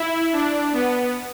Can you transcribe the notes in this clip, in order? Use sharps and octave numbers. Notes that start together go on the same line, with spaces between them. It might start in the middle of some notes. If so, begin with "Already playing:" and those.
Already playing: E4
D4
B3